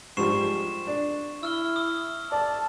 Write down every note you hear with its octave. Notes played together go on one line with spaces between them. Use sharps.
G#2 F3 G3 C#6 C7 E7
D4
E4 E6 F6 G7
D#6
D5 A5